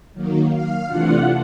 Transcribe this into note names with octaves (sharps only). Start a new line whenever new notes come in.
D#3 F#3 A#3
F5
C3 E3 A3 D4 F4 F#5